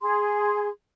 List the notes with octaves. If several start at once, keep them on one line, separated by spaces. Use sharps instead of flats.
G#4 C6